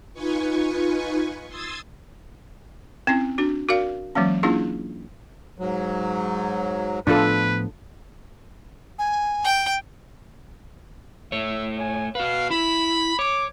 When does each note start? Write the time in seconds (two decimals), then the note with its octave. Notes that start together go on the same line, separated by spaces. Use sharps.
0.13 D#4 F4 B4 G#5 C#6
1.48 C6 D#6 E6 G#6 A6
3.07 C4 C#4 E4
3.38 D4 F#4
3.69 F#4 A#4 D5 F5
4.15 E3 F#3 G#3 A#3 C#4
4.43 A#3 C#4 D4 E4 F4 G#4
5.58 G#2 F#3
7.07 A2 F3 B3 D4 F4 A4 B4
8.99 G#5
9.44 G5
11.32 A3 C#5 E5
11.80 G#5
12.15 F#4 B4 F5
12.51 E4 B5
13.19 C#5 D6